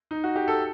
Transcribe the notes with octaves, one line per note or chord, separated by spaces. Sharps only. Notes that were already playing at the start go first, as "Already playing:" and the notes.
D#4
F#4
G4
A4